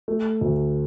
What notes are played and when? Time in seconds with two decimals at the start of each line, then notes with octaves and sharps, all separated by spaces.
0.08 A3
0.41 D2